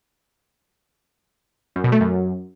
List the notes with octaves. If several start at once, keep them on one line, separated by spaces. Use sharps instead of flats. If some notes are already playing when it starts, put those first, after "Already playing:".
F#2
B2
A3
F#2